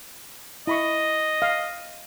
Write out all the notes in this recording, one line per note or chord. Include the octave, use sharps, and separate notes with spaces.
E4 D#5 B5 C#6
F5